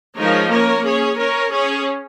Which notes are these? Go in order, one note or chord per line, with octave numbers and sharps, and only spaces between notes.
F3 G#3 D#4 A#4 C#5
A#3 C#4 A#4 C#5
C#4 G#4 C#5
C#4 A#4 C#5
C#4 G#4 C#5